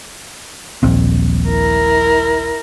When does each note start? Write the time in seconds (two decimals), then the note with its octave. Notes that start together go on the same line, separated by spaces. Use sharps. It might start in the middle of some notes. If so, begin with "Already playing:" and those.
0.83 D#1 A#1 C4
1.48 E4 A#4